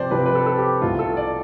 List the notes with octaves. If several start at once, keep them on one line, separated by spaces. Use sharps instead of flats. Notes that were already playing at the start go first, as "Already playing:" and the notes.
Already playing: C3 F3 C4 C5 D5
C3 F3 C4 B4
B4
A4
A4
G4
C2 B2 A3 F4
A4
D5